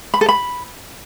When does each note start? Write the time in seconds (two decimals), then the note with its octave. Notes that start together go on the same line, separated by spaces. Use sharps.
0.14 B5
0.21 A4
0.29 B5